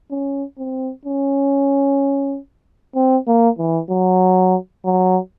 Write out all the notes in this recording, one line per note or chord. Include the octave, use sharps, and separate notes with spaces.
C#4
C4
C#4
C4
A#3
E3
F#3
F#3